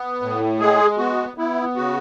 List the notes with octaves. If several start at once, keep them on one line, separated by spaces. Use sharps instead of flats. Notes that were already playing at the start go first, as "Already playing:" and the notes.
Already playing: B3
A2
G#3 G#4
B3 F#4
B3 E4
C#3 F#4